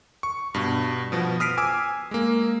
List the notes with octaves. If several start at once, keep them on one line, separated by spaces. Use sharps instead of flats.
C#6
G2 B2
B2 F3 B3
D#6 F6 B6 C7 D7 D#7
G#5 D6 E6
G#3 A#3